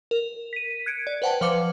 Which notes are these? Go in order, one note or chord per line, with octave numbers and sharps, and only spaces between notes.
A#4
B6 D#7
F#6 G#6 C#7 D7
D5
B4 C5 F#5 G5 A5
F3 B4 C5 F5 D6 C#7